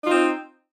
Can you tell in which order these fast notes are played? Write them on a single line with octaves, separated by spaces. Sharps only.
D#4 F4 C4